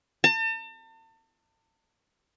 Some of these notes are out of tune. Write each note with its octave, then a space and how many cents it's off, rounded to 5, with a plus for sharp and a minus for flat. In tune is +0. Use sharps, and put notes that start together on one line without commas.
A5 +40